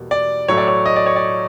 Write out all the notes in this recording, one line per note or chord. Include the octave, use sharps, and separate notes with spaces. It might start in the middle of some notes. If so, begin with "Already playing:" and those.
Already playing: E2 B2 G3 A#3
D5
A2 F#3 A3 C#5
D5
C#5
D#5
D5
C#5
D5